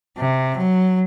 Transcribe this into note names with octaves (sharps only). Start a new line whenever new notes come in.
C3
F#3